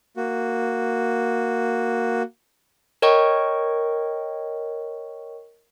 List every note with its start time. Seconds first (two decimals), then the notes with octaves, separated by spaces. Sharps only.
0.17 A#3 F#4
3.02 A#4 C#5 D#5 G5 C#6